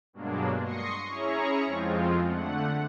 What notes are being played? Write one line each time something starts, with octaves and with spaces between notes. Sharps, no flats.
G2 B2 F#3 G#3 A#3 D4
C6 C#6 D#6 A#6 C7 C#7
C#4 E4 G#4 C#5 A#5 C#6
F2 F3 G#3 C4 F4
D3 A3 F#5